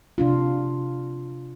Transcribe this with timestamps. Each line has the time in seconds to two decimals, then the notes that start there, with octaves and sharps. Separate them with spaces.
0.18 C3 D4 F4